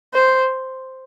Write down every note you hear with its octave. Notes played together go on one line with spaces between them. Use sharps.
C5